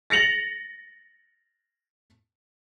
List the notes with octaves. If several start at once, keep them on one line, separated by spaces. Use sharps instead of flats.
A6 A#6 C#7 F7 F#7